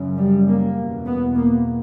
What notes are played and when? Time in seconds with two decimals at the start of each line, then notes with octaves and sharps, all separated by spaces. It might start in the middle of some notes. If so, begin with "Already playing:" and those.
Already playing: F#2 C#3
0.18 G3
0.47 A#3
0.77 E2 B2
1.06 B3
1.36 A#3